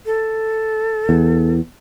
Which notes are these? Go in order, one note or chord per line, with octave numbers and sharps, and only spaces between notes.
A4
E2